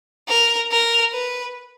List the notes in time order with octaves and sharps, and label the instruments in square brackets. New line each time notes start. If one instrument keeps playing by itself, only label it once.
[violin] A#4
A#4
B4